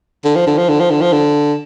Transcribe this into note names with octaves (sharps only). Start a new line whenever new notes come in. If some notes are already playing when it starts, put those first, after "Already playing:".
D3
F3
D3
F3
D3
F3
D3
F3
D3